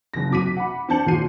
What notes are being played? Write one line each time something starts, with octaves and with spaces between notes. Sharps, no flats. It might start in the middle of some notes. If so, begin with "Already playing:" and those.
F#1 A#6
C3 F#3 D6 B6 D#7
F#5 B5
C4 D4 A5 G6 C#7 F#7
D#2 A#2 F#4 G#4 C7 D#7